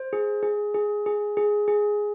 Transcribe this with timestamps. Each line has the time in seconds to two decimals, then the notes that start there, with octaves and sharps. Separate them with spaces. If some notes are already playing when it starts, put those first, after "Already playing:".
Already playing: C5
0.13 G#4
0.43 G#4
0.74 G#4
1.06 G#4
1.37 G#4
1.68 G#4